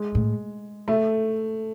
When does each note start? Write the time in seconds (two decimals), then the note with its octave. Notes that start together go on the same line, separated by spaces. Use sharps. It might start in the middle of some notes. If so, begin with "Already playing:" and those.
Already playing: G#3
0.15 A2
0.88 A3